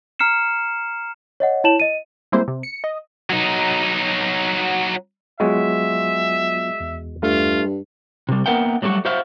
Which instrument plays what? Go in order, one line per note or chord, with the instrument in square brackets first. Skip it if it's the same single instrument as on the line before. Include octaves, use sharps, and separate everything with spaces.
[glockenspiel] A#5 F6 C7 C#7 E7
[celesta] C#5 D#5 F#5
E4 C#5 A5 E7 F#7
D#5 D#7
[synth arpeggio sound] G3 G#3 A#3 C4 E4 C5
C3
C#7
D#5
[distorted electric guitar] F#3 D#4
[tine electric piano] F#3 B3 F4 [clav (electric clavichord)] G#3 F#4 G#4 [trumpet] E5
[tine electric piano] E2
[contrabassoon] G2 [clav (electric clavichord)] A3 [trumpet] F4
[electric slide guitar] C3 G3
A#3 B3 A#4 E5 F#5 G5
F#3 G3 A3 A#3 F#4
F#4 C5 E5 F5